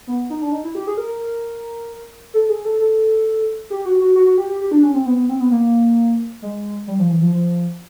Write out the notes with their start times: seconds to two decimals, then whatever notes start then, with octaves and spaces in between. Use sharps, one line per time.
0.07 B3
0.30 D#4
0.41 D4
0.52 D#4
0.64 E4
0.75 G4
0.87 G#4
0.97 A#4
2.34 A4
2.49 G#4
2.65 A4
2.79 A4
3.70 G4
3.85 F#4
4.00 F#4
4.15 F#4
4.26 F#4
4.37 G4
4.49 G4
4.61 G4
4.71 D4
4.83 C#4
4.94 C4
5.06 B3
5.17 B3
5.29 C4
5.40 B3
5.51 A#3
6.42 G#3
6.87 G3
6.99 F3
7.10 E3
7.21 F3
7.33 F3